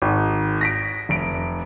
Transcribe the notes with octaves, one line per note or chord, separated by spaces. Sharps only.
G#1
A#6 B6 D7
F1 D7